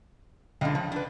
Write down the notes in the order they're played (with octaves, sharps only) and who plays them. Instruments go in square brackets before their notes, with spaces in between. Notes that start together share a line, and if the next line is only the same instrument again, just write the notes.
[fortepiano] C#2 [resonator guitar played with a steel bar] D3 D#5
[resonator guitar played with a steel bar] F3
D4 B4